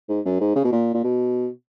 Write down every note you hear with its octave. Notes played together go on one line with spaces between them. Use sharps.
G#2
F#2
G#2
C#3
B2
A#2
A#2
B2